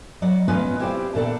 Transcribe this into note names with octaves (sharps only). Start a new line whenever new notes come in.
F#3 D5 D#5 F#5
B3 C#4 F4 B4 D#5
C4 E4 G4 C5 D5 F5
A#2 B3 A4 D5 F5 F#5